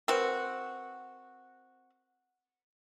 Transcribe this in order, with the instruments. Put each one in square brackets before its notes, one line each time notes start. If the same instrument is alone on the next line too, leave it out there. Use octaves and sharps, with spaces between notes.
[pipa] C4 F#4 [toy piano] A#4 B4 B5